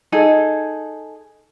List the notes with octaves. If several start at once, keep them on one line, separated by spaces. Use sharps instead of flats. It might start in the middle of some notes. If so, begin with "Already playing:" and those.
D#4 G#4 A4